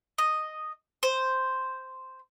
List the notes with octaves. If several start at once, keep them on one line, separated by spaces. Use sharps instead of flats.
D#5
C5